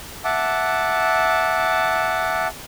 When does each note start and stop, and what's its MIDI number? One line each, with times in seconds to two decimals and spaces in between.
0.24 2.47 76
0.24 2.47 78
0.24 2.47 81
0.24 2.47 86